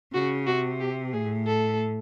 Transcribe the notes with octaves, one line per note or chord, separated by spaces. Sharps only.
C#3 F#4
C3 F#4
G4
A2 G#4
A4